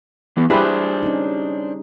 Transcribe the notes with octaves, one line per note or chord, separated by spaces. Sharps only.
E3 B3
G3 D4 E4 G4 G#4 B4 C5
C#4 D#4